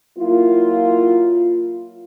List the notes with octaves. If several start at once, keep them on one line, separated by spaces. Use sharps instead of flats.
F#3 A#3 E4 F4